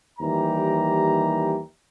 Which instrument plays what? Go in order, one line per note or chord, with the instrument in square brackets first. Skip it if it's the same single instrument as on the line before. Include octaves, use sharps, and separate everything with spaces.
[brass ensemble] D#2 E3 G3 G4 A#5